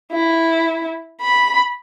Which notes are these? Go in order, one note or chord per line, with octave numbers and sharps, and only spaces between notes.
E4
B5